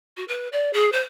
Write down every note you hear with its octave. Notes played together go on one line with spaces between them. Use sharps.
F#4
B4
D5
G#4
C5